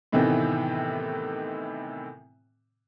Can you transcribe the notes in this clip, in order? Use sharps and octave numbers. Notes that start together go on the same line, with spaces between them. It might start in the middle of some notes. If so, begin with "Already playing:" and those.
A2 C3 D#3 E3 B3 C4